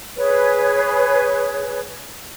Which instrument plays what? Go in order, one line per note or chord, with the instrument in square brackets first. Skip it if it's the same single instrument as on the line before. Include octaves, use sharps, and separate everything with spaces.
[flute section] G#4 B4 C#5